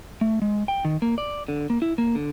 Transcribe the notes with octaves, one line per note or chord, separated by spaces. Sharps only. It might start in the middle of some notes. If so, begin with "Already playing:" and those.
A3
G#3
G5
D#3
A#3
D5
D3
A#3
E4
A#3
D3